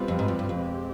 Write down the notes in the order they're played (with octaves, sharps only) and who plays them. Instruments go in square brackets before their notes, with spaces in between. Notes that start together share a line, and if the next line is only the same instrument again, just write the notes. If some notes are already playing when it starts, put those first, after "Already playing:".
Already playing: [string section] B2 G3 C4 F4 B4
[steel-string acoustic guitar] F2
G#2
F2
G2
F2
[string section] G#3 C4 G4